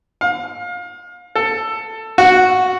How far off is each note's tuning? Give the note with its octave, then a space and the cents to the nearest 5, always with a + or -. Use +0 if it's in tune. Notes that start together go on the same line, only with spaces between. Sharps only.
F5 +30
A4 +15
F#4 -5